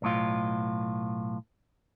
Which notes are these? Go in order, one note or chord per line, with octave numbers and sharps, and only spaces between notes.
B1 A2 F4